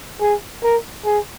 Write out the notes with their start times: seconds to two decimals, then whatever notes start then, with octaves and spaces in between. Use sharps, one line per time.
0.21 G#4
0.63 A#4
1.05 G#4